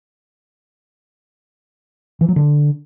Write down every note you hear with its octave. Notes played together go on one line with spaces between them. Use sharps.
E3
F#3
D3